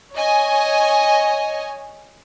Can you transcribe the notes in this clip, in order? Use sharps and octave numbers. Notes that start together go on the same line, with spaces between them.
C#5 D#5 G#5